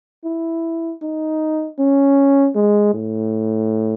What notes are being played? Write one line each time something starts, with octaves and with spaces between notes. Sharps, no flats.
E4
D#4
C#4
G#3
A2